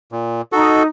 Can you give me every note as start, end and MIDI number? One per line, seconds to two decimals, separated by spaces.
0.12 0.41 46
0.52 0.87 63
0.52 0.83 66
0.52 0.83 69